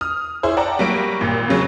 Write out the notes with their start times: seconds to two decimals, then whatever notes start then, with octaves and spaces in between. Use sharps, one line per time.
0.01 D#6 F6
0.43 E4 G#4 C5 C#5
0.57 D5 F#5 G5 A5 A#5
0.79 F#3 G3 A#3 D7
1.21 G#1 A#2
1.48 F2 C#3 F#3 G#3